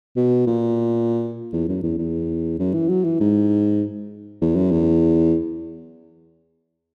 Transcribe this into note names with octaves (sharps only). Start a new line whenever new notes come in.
B2
A#2
E2
F#2
E2
E2
F#2
E3
F#3
E3
G#2
E2
F#2
E2